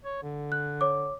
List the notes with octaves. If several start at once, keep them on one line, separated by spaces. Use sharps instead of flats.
C#5
D3
F#6
C#5 D6